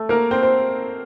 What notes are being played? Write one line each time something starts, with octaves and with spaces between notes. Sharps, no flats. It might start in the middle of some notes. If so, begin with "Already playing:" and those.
Already playing: A3 A4
A#3 A#4
C4 C5
C5